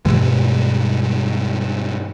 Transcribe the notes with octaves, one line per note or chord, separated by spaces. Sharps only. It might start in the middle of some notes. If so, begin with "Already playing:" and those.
G2 B2 E3 G#3